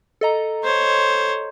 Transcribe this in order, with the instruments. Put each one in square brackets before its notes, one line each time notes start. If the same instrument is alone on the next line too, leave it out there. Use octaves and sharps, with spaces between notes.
[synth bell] A4 D#5 A#5
[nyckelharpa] C5 C#5